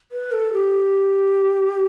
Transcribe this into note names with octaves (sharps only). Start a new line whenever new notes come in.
B4
A4
G4